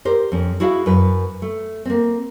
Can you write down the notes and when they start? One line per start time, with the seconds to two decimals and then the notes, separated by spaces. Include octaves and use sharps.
0.05 G4 A#4 C5
0.32 F2 C#4
0.60 E4 F#4 G#4 E5 F5
0.86 F#2 B4
1.42 A3
1.85 A#3 C4